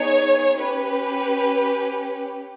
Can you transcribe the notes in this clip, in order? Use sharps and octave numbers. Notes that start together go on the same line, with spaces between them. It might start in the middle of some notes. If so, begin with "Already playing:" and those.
Already playing: B3 D#4 G#4 C#5
C#4 G4 B4